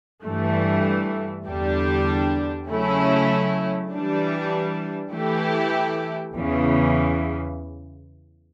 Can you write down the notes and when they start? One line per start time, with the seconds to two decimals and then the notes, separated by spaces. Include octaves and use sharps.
0.25 G2 E3 A3
1.46 E2 D3 G3 D4 G4
2.69 C#3 F#3 A3 C#4 E4
3.91 E3 G3 D4
5.12 E3 A3 E4 G4
6.35 E2 C#3 E3